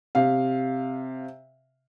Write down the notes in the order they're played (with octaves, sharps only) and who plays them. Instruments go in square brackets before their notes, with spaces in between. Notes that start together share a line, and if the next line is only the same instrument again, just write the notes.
[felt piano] C3 F5